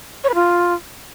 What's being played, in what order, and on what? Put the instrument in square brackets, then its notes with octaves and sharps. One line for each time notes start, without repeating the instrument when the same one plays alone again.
[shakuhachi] C#5
B4
F4